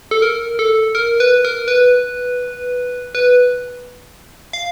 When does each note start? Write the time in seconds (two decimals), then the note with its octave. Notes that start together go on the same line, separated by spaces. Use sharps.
0.11 A4
0.22 A#4
0.59 A4
0.95 A#4
1.20 B4
1.45 A#4
1.68 B4
3.15 B4
4.53 F5